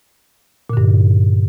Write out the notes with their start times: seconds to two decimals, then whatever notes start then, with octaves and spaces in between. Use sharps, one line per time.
0.70 A#2
0.73 D3
0.77 G2